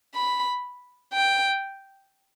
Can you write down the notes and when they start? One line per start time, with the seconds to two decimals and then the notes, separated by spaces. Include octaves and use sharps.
0.15 B5
1.14 G5